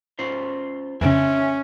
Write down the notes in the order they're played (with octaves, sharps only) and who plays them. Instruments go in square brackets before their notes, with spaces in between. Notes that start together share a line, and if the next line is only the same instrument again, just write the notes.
[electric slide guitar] C#4 F4 C5
[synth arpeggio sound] F2 C#3 [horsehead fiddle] C#4 [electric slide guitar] A4 E5 G#5